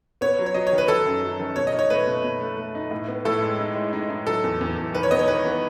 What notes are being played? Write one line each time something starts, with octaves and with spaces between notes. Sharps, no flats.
B3 C#5
F#3
C#5
F#3 D#5
C#5
D#3
B4
D#3 A4
F#2
F#3
D#3
B2 C#5
D#5
D#4
C#5
A3 B4
B2
B2
A3
A3
D#4
A2
B3
A2 A4
G#3
D#4
G#3
D#4
D#4
F#3 A4
E2
E2
E2
D#3 B4
C#5
B3 D#5
C#5
D#3 B4
B3